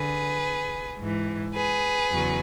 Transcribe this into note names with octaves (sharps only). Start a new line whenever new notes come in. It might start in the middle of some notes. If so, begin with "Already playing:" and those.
Already playing: D3 G#4 B4
G#2 E3
G#4 B4
E2 C#3 F#3